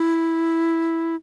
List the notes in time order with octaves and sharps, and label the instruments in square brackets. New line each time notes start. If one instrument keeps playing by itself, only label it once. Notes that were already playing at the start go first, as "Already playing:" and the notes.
Already playing: [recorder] E4